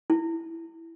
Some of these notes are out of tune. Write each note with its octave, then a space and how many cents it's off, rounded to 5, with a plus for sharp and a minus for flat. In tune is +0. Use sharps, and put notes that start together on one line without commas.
E4 +0